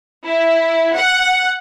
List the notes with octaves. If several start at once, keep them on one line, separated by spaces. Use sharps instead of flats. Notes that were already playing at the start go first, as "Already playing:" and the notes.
E4
F#5